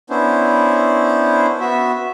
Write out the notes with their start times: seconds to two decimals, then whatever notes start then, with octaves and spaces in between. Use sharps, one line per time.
0.10 B3 C#4 D4 E4 C5
1.60 B3 F#4 E5